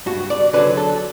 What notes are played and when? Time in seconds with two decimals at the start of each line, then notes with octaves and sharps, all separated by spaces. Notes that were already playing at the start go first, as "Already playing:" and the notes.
0.06 G2 F#4
0.30 D5
0.53 D3 F#3 B4
0.77 A4